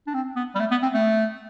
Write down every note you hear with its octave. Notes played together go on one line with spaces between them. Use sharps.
D4
C4
B3
G3
A3
B3
C4
A3